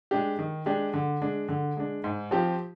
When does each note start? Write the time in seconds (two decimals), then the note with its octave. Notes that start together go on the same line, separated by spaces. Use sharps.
0.11 G#3 D4 G4
0.39 D#3
0.66 G#3 D4 G4
0.94 D3
1.22 G#3 D4
1.49 D3
1.77 G#3 D4
2.04 G#2
2.31 F3 C4 G4